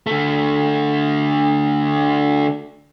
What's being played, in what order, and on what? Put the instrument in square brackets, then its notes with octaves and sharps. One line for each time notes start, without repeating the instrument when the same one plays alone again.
[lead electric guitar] D3 A3